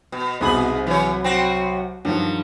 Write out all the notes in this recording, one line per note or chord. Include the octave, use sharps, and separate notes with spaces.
B2
C2 G#2 B2 G#4 B5 F#7
E3 F#3 C#5
C4 F#4
G2 D#3 F3 F#3